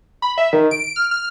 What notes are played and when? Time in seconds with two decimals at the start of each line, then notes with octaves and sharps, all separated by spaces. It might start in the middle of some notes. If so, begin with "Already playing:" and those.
0.22 B5
0.38 E5
0.53 D#3
0.71 D7
0.96 F6
1.11 F6